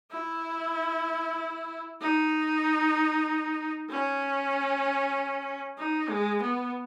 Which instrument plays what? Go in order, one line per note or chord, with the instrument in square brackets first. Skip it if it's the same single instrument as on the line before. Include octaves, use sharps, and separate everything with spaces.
[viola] E4
D#4
C#4
D#4
G#3
B3